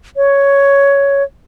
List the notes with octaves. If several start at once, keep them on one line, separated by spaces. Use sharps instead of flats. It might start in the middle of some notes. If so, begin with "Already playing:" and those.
C#5